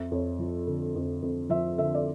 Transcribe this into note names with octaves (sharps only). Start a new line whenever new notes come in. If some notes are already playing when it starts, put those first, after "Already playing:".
Already playing: F2 E5
F2 C#5
F3
D3
F2
F2
F3 E5
D3 E5
D5